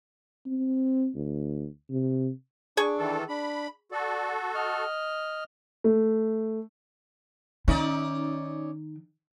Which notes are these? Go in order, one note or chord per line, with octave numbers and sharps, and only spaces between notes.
C4
D2
C3
D4 G#4 C#6
D#3 E3 A4
D4 B5
F#4 A4 D5
D#5 F6
A3
D#3 C#4 D#4 D5